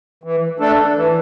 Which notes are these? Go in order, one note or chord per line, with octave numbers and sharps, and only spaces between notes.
E3
A3 D4 A4
E3